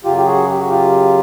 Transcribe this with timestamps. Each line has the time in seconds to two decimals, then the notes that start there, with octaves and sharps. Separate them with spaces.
0.04 F#2 C#3 F#3 F4 G4
0.17 G4
0.26 F#4 G#4
0.49 G4
0.59 F#4
0.70 F4 G4